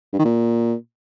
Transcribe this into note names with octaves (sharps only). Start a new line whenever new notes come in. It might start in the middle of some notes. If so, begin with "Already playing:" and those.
G2
D#3
A#2